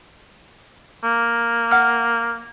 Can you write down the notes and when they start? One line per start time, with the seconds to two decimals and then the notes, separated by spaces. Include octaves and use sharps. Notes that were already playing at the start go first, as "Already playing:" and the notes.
1.03 A#3
1.71 F#5 F6